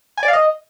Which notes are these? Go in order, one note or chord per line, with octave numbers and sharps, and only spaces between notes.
G#5
D5
F5
D#5